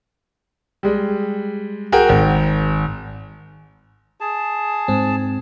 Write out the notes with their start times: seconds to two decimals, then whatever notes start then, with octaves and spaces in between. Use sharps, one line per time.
0.83 G3 G#3
1.92 F#4 G#4 A#4 G5
2.09 G#1
4.20 G#4 A5
4.88 G#2 C4